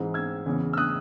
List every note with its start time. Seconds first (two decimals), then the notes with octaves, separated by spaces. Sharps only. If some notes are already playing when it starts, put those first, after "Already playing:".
Already playing: G#2 E3 G#3 C4
0.14 E6 G#6
0.46 E2 C#3 E3
0.73 E6
0.77 D#6 F#6